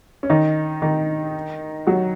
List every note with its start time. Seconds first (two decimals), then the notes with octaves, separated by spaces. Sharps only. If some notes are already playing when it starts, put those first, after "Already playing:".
0.23 C#4
0.30 D#3 D#4
0.82 D#3 D#4
1.87 F#3 F#4